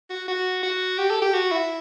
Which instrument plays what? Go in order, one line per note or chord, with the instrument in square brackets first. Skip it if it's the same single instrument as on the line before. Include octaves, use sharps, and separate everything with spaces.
[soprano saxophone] F#4
F#4
F#4
G4
A4
G4
F#4
E4